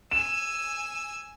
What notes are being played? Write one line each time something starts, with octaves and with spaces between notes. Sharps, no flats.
G#5 E6 E7